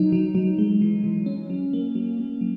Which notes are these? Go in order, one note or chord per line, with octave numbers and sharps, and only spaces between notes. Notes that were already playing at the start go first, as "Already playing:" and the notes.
Already playing: F#3 D#4
F#3
F#3
G#3
E3
E3
C#4
F#3
A#3
F#3
A#3
F#3